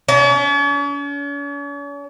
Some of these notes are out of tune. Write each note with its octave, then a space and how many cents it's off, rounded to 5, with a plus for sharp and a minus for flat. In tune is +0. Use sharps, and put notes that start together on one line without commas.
C#4 +45